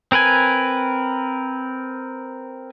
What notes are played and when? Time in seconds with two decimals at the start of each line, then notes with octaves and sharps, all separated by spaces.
0.12 C4 A#4 B4 G#5